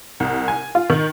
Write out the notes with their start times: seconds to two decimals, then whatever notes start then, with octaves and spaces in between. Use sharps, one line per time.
0.20 C2
0.48 G#5
0.75 F4
0.90 D#3